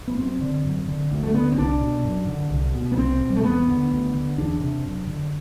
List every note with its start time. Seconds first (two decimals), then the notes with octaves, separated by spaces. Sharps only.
0.08 B3
0.17 F#2 C4
0.41 D3
0.64 F#2
0.88 D3
1.11 D2
1.23 A3
1.34 D3 B3
1.52 C4
1.58 C2 D4
1.81 B2
2.04 F#2
2.27 D3
2.50 C2
2.74 B2
2.92 B3
2.97 C2 C4
3.21 B2
3.30 G3
3.36 A3
3.43 E2 B3
3.68 D3
3.91 D2
4.14 D3
4.38 E2 D4
4.60 C3
4.84 F#2
5.07 D3